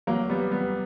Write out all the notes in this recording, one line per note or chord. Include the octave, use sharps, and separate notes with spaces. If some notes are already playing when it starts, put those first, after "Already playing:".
F#3 A#3
G3 B3
G3 B3